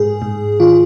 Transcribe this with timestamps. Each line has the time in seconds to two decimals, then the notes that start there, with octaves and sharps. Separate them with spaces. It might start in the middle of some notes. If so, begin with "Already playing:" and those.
Already playing: G#2 G#4
0.22 G#2
0.60 D#3 F4